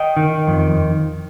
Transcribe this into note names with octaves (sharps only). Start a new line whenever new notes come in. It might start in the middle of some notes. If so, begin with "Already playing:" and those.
Already playing: D#5 G5
D#3
F2